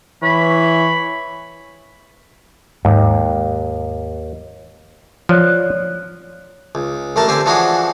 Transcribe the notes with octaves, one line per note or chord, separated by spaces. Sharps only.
E3 C#5 B5
D#2 G#2
F3 C#5 D5 F#6
C#2
A1 A3 A#4 A5
D3 C4 G4 C5 G#5
E3 F3 C#4 D4 F#4 G#4